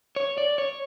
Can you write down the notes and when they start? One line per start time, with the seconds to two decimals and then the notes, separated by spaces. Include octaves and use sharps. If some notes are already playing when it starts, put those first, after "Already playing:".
0.16 C#5
0.38 D5
0.58 C#5